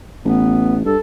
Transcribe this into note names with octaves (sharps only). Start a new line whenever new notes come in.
A1 B3
G2 A4